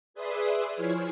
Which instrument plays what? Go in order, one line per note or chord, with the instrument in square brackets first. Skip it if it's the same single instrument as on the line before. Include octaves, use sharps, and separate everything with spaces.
[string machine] G#4 B4 D5 E5 C6 D#6
F3 E4 C#5 G#5 F6 C7